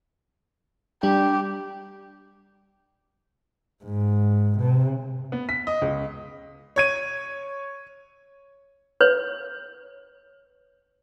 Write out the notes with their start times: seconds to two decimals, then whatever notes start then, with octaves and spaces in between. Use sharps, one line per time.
1.03 G3 D4 G4
3.84 G#2
4.58 C3
5.32 B3
5.49 B6
5.67 D#5
5.82 C#2
6.76 C#5 G#6 D#7
9.01 B4 C#5